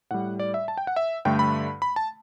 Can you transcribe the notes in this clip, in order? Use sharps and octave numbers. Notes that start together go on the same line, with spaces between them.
A2 G3 F#5
D5
E5
A5
G5
F#5
E5
G2 D3 A3 G5
B5
B5
A5